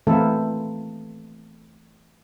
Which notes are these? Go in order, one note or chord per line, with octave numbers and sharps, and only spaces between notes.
E3 A3 A#3 C4 E4 A4